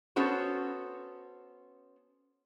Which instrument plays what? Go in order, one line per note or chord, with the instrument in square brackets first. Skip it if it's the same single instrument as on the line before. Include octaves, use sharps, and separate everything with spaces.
[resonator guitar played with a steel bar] B3 C#4 F#4 A4 C5